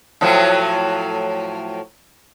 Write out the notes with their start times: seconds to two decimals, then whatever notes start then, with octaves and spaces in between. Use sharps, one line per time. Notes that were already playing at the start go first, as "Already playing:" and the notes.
0.21 A2 F3 F#3